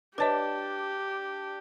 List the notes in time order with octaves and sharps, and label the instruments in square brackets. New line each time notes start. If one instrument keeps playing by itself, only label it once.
[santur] D4 A5 [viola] G4 [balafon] B4 C#5 D#5